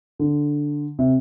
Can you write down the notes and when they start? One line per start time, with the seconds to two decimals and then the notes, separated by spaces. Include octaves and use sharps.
0.19 D3
0.99 C3